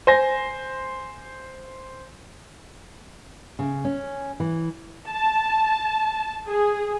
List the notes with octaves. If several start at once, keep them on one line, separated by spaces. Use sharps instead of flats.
C5 G#5 A#6
C#3
C#4
E3
A5
G#4